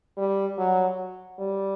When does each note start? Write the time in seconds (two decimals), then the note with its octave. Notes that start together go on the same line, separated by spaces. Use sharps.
0.18 G3
0.58 F#3
1.39 G3